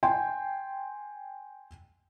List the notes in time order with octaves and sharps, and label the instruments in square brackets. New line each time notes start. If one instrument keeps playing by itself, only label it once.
[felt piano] G5 G#5 C6